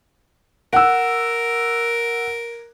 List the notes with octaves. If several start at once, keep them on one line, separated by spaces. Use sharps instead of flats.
A#4 F#5 E6